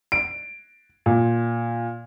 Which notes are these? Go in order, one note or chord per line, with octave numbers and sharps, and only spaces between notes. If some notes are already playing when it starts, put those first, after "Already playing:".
D7
A#2